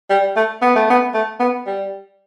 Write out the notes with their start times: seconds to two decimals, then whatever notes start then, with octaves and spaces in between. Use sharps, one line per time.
0.10 G3
0.37 A3
0.62 B3
0.75 A3
0.90 B3
1.14 A3
1.40 B3
1.67 G3